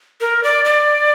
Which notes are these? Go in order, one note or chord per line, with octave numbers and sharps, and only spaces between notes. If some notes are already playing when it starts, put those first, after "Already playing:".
A#4
D5
D5